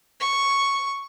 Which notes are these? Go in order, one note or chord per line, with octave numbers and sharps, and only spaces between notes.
C#6